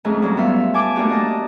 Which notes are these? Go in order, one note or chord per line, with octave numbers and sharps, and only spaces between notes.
F2 G#2 A3 C#4
G2 F#3
B3 F4 E5 F5
G#5 A5 D6
A3 A#3 D4 F#4 G4
A#3 D#5 A5